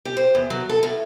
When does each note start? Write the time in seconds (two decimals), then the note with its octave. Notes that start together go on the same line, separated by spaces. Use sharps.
0.05 G4
0.17 C5
0.35 E2
0.50 F#3
0.69 A4
0.83 A2